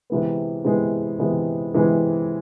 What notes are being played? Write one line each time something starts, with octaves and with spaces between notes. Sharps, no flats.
C3 E3 G#3 B3
C3 E3 G#3 B3
C3 E3 G#3 B3
C3 E3 G#3 B3